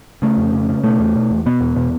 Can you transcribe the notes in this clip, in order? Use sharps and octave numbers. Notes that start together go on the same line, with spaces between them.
C#3 A3
F2
C#3
C#3
B2 A3
E2
B2
E2
B2 B3
E2
B2